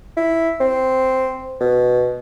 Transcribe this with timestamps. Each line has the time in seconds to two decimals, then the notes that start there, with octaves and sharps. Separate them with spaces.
0.17 E4
0.60 C4
1.61 B2